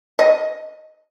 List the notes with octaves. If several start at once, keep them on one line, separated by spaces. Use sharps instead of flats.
D#5